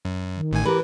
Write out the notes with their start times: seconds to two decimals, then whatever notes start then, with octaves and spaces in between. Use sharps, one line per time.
0.05 F#2
0.36 D#3
0.51 A1 A2 G#5
0.65 E3 G4 A#4 B4